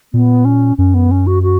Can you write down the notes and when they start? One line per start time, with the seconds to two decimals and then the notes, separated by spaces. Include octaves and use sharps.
0.13 A#2 B3
0.45 C#4
0.78 F#2 C#4
0.94 B3
1.11 C#4
1.27 F#4
1.43 F#4